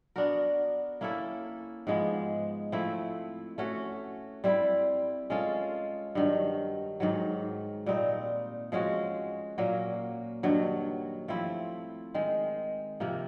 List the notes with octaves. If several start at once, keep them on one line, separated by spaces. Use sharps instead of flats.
B3 D4 F#4 A#4
A#3 C#4 E4 A4
G#2 F3 G#3 B3
F3 A3 C4 E4
A3 C#4 F#4
G3 C4 E4 G4
G#3 C#4 F4 A4
G2 D#3 F#3
G#2 D#3 F#3
A#2 G3 C4 D#4
F3 G#3 C#4 F#4
A#2 F#3 A#3 C#4
G2 D#3 F#3
F3 A3 C4 E4
D#3 G#3 C4
C3 F3 A#3